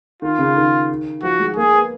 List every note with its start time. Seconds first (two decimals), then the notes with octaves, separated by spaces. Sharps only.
0.22 D#3 F4
0.39 C#3
0.56 D#3
1.23 F3 F#4
1.40 G#3
1.56 A#3 G#4
1.73 B3